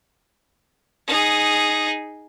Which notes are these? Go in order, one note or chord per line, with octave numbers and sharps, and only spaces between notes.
D#4 G#4